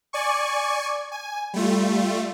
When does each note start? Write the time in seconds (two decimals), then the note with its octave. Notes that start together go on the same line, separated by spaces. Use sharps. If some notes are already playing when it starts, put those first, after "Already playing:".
0.13 D5 G#5 C#6
1.12 G#5
1.53 G3 A3 F4